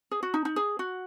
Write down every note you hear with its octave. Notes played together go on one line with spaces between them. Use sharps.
G#4
F#4
D#4
D#4
G#4
F#4